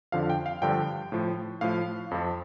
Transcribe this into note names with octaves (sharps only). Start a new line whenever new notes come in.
F2 D3 F3 F5
G5
F5
G2 D3 F3 G5
A2 F3
A2 F3 F5
F2 F3